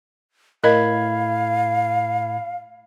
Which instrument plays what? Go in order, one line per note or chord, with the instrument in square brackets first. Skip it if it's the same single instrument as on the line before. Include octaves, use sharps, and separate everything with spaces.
[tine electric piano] A2 B5 G#6 [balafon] A#4 D#5 [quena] F5